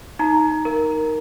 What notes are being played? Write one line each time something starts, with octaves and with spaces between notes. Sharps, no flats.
D#4 A#5
A#4